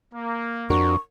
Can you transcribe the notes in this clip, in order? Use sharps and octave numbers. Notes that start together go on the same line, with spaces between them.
A#3
F2 D4 F#4 A#4 C#6